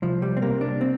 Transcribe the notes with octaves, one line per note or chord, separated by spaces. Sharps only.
C2 F3
G3
C4
C3 A#3
D4
C4